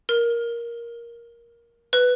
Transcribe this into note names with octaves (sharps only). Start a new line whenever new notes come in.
A#4
B4